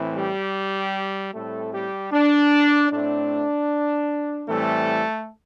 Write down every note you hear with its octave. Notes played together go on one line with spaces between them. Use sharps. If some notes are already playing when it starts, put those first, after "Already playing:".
Already playing: A2 E3 C4
G3 G4
A2 G3 A3 C4 A4
G3 G4
D4
A2 A3 C4 D4
A2 E3 G3 A3 C4 A4